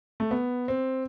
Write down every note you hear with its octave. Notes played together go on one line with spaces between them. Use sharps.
A3
B3
C4